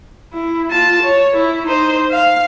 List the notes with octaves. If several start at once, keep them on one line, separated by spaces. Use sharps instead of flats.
E4
F4 A5
C#5
E4
D#4 C5
F5